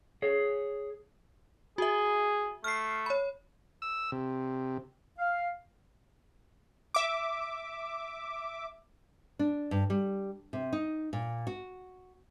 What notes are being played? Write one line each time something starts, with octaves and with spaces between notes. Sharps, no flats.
G#4 C#5
F#4 G#4 E5
A3 F6 C7
C#5 B5
E6
C3
F5
E5 D6
D4
G2
G3
C3
D#4
A#2
F#4